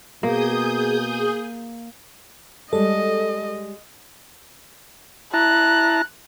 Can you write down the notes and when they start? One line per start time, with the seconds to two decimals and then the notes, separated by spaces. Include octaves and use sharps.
0.23 B2 A#3 G#4 D#6 G6
2.73 G3 G#3 A4 D#5
5.34 E4 A5 A#5 F#6